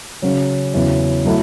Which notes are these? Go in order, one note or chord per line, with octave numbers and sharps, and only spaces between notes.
C#3 F#3 C#4
E2 C#3 F#3 C#4 E4
F#3 A3 E4